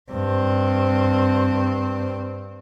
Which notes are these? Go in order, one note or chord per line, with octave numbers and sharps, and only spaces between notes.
G2 C4